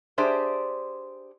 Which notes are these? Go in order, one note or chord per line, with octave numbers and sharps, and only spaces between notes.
D4 G4 G#4 C5 D5 E5